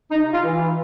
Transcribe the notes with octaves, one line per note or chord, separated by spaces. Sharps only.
C3 D#4
F4
E3